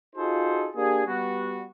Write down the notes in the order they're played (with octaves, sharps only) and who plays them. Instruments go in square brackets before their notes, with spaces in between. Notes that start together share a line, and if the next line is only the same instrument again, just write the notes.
[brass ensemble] D#4 F4 F#4 G#4 A4 C5
A#3 D4 G4 G#4
G3 B3 F#4